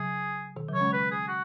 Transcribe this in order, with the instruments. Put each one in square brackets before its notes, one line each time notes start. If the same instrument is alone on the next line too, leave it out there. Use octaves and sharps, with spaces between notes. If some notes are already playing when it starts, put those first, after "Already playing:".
Already playing: [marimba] C#3 F#3 [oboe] G#4
[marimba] B2 D#3
C#3 F#3
[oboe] C#5
[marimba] G#3 C#4
[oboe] B4
G#4
F#4